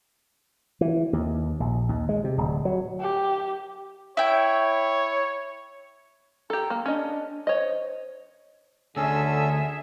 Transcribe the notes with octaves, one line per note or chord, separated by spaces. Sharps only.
E3
D#2
A#1
D#2
G#3
C3
D1
F#3
G4
E4 C#5 G5
G4 A4 A#5
A#3
C#4 D4 D#5
C5 C#5 D#5
D2 D3 C#4 G#4 A4 E5 E6